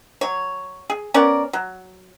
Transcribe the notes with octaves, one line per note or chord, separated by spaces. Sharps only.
F#3 C#5
G#4
B3 C#4 A#4 D5
F#3